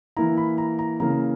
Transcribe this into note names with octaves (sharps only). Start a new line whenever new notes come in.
E3 A#3 E4 A#5
B5
A#5
A#5
C#3 E3 A#3 A#5